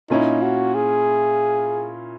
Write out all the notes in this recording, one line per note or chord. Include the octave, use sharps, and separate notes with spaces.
A#2 A#3 C#4 D#4 E4
F#4
G#4